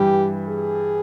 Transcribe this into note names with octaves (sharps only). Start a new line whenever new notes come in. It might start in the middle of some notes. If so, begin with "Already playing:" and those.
Already playing: G2 E3 G3 G4
G#4